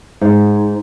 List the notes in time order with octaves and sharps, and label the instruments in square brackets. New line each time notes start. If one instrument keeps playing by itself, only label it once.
[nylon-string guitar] G#2